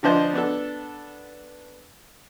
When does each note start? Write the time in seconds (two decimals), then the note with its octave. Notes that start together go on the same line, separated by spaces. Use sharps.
0.03 D3 F3 D4 C5 D#5
0.33 B3 D4 A4